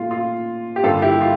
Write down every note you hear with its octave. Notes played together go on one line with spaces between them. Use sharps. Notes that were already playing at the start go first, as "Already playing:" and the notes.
Already playing: A#2 A3 F4
F4
G4
G2 D3 G3 A#3 F4 A4
E4 G4
F4